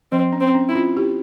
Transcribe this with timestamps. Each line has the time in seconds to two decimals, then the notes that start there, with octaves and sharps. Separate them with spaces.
0.12 F3 C4
0.33 C#4
0.40 C4
0.54 C#4
0.69 E4
0.75 C#4 F4
0.97 E4 G4